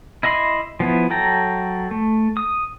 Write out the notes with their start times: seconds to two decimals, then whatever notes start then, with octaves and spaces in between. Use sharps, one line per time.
0.23 E4 D#5 E5 B5 C6
0.80 F3 B3 E4
1.10 F#3 A4 G5 A#5
1.91 A3
2.37 D#6